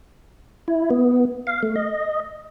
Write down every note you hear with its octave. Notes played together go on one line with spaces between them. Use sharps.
E4
B3
F5
A3
D#5